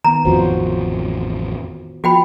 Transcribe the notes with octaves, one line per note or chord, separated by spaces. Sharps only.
D#3 B3 A#5
A1 F2 F3 F4 F#4 C5
F3 F#4 G5 B5